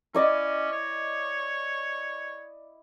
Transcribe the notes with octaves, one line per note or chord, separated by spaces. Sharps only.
C#4 E4 D5 D#5
C#5